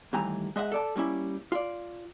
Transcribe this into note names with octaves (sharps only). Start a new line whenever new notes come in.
D#2 E3 G3 A3 G#5 A#5
G#3 D#5 E5 F#5
A4 D5 A5
G3 A#3 C#4 E4
F4 D5